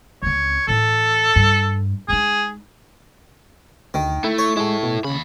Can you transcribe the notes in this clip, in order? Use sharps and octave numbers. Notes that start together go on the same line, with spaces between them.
C#2 C4 C#5
A2 E3 A4
G2
G#3 D#4 G#4
D2 D#3
A3 E4
C#5
G#3 E4 A4
B2
D#2 C#3 B5